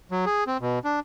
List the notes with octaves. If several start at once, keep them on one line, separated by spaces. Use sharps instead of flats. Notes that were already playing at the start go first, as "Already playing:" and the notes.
F#3
G#4
C4
B2
D4